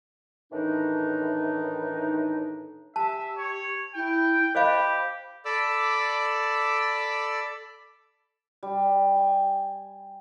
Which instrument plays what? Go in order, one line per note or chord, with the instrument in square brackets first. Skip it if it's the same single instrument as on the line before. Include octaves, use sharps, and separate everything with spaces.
[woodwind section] A2 D#3 E3 D4 D#4
[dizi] G4 [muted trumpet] E5 [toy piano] A5
[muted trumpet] C#5
[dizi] E4 [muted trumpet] G5
[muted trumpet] G4 [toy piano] C5 D#5 F5 [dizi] B5
[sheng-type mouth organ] A4 D5 B5 D6 E6
[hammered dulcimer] G3
G#5